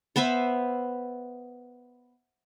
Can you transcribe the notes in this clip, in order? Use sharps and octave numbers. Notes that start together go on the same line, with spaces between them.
B3 B4 C5 E5